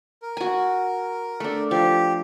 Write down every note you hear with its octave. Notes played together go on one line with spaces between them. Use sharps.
A#4
F#4 G#5
A3 D4
F3 G4